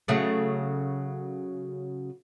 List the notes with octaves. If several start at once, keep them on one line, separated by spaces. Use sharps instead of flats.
C#3 F#3 A3